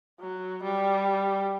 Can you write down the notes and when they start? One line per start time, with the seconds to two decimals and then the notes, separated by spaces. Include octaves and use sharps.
0.21 F#3
0.63 G3